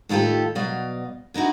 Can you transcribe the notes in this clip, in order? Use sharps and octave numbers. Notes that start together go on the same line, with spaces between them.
A2 D#3 F4 G4 A4
B2 F#3 D5 D#5 F5
D3 D#4 E4 F#4